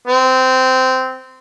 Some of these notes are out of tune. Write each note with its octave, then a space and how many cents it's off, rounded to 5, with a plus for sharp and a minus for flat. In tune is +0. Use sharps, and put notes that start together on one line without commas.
C4 -15